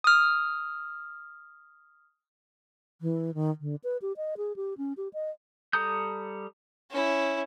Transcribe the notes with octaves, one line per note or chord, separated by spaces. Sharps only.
D#6 F6
E3
D#3
D3
B4
G4
D#5
G#4
G4
C#4
G4
D#5
G3 A4 A#5 D#6 G6
C#4 E4